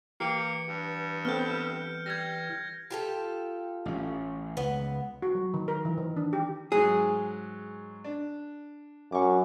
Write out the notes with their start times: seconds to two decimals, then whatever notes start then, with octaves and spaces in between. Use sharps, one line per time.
0.20 E3 A#3 G4 C#7 D7
0.68 G2
1.25 B3 C4 A4 F6 G6
2.06 G3 G#6 A#6
2.90 F4 G4 A4
3.86 A1 C#4
4.57 C#2 B3
5.22 F#4
5.35 F#3
5.54 D#3
5.68 A#4
5.85 E3
5.98 D#3
6.17 D4
6.33 G4
6.72 G#2 F#3 G#4
8.04 D4
9.12 F#2 C#6 D6